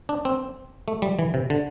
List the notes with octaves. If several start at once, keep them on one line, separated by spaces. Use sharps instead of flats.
D4
C4
A3
G3
E3
C3
D3